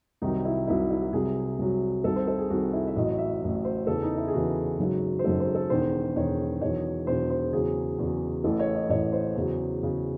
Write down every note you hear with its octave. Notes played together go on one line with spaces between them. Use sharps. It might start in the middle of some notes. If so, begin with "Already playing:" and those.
C2 C3 D#3 F#3 D#4
E4
C2 C3 D#3 F#3 E4
E4
F#4
C2 C3 F#3 G#4
C2 C3 F#3
C2 C3 D#3 A4
C5
A4
G#4
C2 C3 D#3 F#4
E4
E5
A1 A2 F#3 D#5
E5
A1 A2 F#3
C5
E2 C#3 E3 A4
D#4
E4
G#4
E2 C#3 E3 F#4
G#1 F#2 C#3 F#3
C5
G#1 F#2 C#3 F#3 A4
C5
A4
E1 E2 D#3 C5
E1 E2 D#3 C#5
E1 E2 D#3 F#3 C#5
E1 E2 D#3 F#3 C5
C5
E2 C#3 F#3 G#4
E2 C#3 F#3
A1 A2 E3 A4
C#5
D#5
A1 A2 E3 C#5
C5
E2 C#3 F#3
E2 C#3 F#3